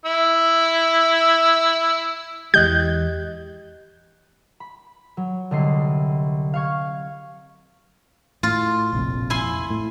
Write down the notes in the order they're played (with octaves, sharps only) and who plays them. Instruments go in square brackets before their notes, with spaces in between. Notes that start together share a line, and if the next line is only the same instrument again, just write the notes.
[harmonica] E4 E6
[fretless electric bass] E2 E3 G#3 [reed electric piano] G4 D#5 F#6 [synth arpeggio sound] G6
[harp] B5
F#3
C2 D3 D#5 C7
F5 C#6 G#6
[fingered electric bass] A2 [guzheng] F4
[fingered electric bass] F1 A#1 F2
[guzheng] E4 G#5 C6
[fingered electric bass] A2